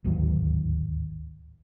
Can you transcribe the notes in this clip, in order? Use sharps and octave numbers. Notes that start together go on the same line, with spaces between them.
D1 G#1 D#2 F#3